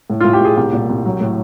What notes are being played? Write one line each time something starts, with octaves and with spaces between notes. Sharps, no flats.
A2
F4
A2
G4
A2 G#4
C2 G4
A#2
C2
F#3
A2